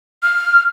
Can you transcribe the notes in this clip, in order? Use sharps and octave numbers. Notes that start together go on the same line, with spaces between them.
F6